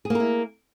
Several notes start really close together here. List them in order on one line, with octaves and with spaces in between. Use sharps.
G#4 A#3 A#4 E4